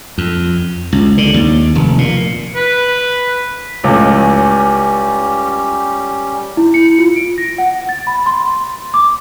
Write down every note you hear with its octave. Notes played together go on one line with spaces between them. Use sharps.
F2
C#2
D3
D#2
F1
A#2
B4
C#2 A2 G3 C#4 G4
E4
C#7
F4
D7
A#6
F#5
A6
B5
C6
D6